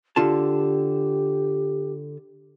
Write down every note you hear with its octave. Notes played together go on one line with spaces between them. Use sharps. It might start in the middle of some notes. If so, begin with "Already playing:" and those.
D3 F4 G4 A5